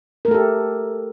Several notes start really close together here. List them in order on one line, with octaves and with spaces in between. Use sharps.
A#4 A3 A4 G4